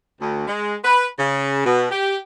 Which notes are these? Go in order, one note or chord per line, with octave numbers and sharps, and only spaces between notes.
D2
G#3
B4
C#3
B2
G4